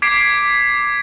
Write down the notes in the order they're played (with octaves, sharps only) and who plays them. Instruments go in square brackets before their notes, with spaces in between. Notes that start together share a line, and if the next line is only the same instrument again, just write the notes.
[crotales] D6 G#6 B6 C7 D7